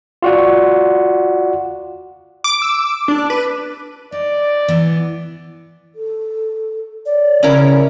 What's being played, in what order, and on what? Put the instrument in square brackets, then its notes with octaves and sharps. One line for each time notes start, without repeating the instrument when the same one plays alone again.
[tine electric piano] F4 F#4 D5 F#5
[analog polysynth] D6
[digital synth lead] E6
D4
B4
[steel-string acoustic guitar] D#4 [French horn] D5
[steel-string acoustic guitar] E3 B3
[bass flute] A4
[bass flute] C#5 [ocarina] D5
[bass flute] C#3 [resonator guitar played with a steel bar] C#4 E4 A#4